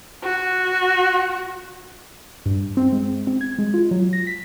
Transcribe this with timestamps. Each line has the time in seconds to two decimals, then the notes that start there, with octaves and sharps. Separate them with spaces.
0.24 F#4
2.46 G2
2.77 C4
2.92 G#3
3.27 C4
3.41 G#6
3.59 G#3
3.74 F4
3.91 F#3
4.13 A#6
4.27 B6